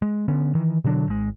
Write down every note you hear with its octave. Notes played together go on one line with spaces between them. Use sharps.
G#3
D3 B3 C#4
D#3 E3
B2 D3 F#3 D4
G#1 G#3